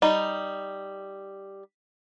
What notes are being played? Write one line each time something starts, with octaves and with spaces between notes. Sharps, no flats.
G3 D#4